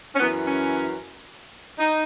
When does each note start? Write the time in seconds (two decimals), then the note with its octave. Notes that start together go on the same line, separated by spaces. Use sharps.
0.15 C#4
0.19 F#2 E3 B3
0.45 C#4
1.78 D#4